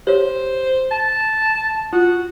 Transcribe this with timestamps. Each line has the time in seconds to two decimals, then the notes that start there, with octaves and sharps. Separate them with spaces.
0.07 G4 C5 C#5
0.91 A5
1.93 F4 F#4